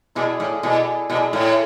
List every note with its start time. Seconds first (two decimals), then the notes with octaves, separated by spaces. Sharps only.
0.15 B2 E4 G#4 D5
0.40 A2
0.63 B2 E4 G#4 D5
1.10 B2 E4 G#4 D5
1.33 A2